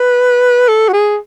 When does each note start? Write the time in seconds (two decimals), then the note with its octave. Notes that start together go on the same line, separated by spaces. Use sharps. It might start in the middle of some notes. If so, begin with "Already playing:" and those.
Already playing: B4
0.68 A4
0.89 F#4
0.93 G#4